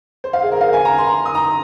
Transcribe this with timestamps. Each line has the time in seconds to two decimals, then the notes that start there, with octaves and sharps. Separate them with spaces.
0.24 C5
0.33 F5
0.42 G#4
0.52 A#4
0.61 F5
0.73 G#5
0.85 A#5
0.98 C6
1.07 A#5
1.25 D#6
1.35 A#5